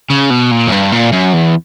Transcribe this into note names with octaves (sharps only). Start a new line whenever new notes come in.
C#3
B2
A#2
F#2
G2
A#2
F#2
E2